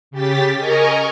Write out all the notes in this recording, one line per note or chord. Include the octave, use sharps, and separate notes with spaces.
C#3 G4 A6 B6
A#4 D#5 G#5 A#5 C#6